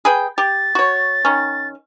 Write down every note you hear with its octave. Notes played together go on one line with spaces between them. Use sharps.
G#4 B4 G5
G4 A6
F#4 C#5
D#3 C#4